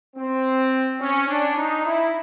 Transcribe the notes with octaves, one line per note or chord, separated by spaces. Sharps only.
C4
C#4
D4
D#4
E4